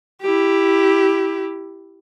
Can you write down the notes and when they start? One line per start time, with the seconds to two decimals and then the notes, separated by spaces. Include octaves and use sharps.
0.22 E4 G4